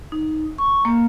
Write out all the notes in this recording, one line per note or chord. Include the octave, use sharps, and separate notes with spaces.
D#4
C#6
A#3